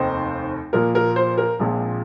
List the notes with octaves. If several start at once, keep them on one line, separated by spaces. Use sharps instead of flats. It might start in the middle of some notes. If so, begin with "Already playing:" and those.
Already playing: F1 D#2 D#3 C4 D#4 C5
A#2 F3 A#3 A#4
A#4
C5
A#4
A#1 A#2 F3 G#3 C4